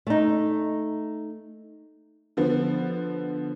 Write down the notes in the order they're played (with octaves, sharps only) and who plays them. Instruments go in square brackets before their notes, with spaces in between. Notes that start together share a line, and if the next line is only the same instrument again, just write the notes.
[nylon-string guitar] A3 D#4
[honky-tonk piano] D3 F3 B3